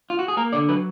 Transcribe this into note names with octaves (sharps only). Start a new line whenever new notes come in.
F4
F#4
G#4
A#3 A#4
D3 D5
F#3 B4